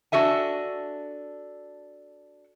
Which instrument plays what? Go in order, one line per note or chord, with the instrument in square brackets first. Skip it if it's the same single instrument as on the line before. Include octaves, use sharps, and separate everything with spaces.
[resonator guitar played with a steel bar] D4 F#4 A4 E5 G#5